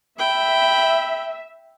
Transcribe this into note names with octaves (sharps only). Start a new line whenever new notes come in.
E5 G5 B5